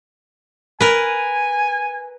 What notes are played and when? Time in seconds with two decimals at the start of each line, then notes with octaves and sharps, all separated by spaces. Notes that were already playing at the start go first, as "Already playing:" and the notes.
0.81 A#4 B4 G#5